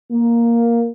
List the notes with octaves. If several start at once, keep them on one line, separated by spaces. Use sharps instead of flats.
A#3